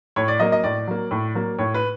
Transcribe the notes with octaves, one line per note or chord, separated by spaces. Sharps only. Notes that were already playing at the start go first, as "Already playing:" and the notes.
A2 C#5
D5
F#3 A#3 D#5
D#5
A2 D5
F#3 A#3
A2
F#3 A#3
A2 C#5
B4